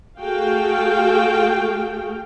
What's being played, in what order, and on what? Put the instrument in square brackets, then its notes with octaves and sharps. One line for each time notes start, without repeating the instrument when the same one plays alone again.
[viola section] A3 F#4 G#4 A4 F5 G5